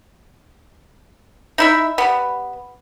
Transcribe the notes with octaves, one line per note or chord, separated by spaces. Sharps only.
D#4 E4 E5
G3 B3